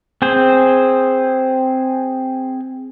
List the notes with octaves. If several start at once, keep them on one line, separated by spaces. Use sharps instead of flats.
C4 G#4 C5